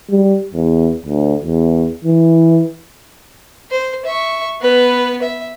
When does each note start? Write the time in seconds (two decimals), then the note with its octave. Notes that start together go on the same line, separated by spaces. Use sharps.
0.10 G3
0.54 E2
1.06 D2
1.43 E2
2.04 E3
3.71 C5
4.05 E5 C#6
4.61 B3 B4
5.22 E5